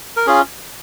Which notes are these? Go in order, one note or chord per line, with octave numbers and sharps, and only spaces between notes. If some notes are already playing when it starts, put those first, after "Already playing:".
A#4
C#4 F4 G#4